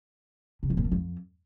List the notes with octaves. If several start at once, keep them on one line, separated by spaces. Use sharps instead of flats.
C3
F2
A#2
F3
F2